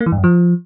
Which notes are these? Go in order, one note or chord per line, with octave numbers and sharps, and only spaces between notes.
A#3
E3
G2
F#2
F3